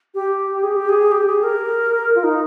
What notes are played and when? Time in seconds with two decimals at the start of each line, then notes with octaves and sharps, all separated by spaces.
0.15 G4
0.63 G#4
0.76 G4
0.89 G#4
1.12 G4
1.27 G#4
1.43 A#4
2.15 F4
2.23 D#4